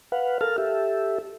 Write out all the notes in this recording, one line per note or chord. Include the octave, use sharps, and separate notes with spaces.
B4 F5 F#5
A4 A#4 F5 A5 F6
G4 A4 E5